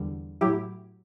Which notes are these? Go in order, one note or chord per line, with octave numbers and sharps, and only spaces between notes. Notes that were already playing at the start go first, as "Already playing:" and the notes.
Already playing: E2 D3 G3
A2 F#3 E4 G4